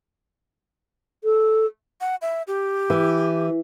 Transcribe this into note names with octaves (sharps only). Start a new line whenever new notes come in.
A4
F#5
E5
G4
E3